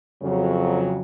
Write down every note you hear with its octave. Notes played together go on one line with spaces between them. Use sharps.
F2 C#3 F#3